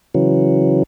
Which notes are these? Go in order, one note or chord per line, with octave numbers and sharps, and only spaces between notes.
C#3 E3 F#3